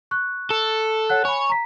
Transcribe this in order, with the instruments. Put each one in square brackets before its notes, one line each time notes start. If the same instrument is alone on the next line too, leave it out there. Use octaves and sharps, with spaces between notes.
[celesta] C#6 F#6
[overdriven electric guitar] A4
[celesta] C#5 F#5 F#6
[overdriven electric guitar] C#5 [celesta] G#5 B5
[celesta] A#5 B6